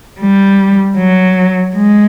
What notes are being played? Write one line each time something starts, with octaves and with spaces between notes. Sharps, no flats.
G3
F#3
G#3